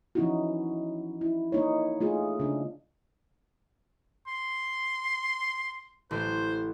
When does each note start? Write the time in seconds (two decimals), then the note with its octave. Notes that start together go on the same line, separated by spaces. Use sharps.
0.15 E3 F3 C#4 D#4 E4 F#4
1.21 E4
1.52 A#3 D#4 C#5
2.00 A3 F4 G#4
2.40 C#3 D4
4.27 C6
6.11 A1 A3 C5